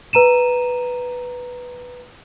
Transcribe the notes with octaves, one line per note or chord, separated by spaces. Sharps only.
B4 A#5 D#7 E7